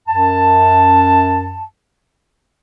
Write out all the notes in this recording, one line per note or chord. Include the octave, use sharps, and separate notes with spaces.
F#2 A5